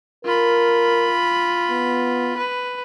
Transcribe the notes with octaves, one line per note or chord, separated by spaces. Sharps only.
F4 A#4 B5
B3
B4